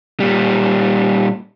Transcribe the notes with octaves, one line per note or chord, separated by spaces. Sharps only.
A#2 G3